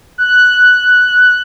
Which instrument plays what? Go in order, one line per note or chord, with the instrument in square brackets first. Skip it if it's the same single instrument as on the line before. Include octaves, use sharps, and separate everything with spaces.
[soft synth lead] F#6